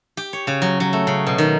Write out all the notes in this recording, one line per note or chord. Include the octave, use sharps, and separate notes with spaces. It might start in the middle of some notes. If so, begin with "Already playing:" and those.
G4
C#5
C#3
F#3
F#3
A3
C#3
B2
D#3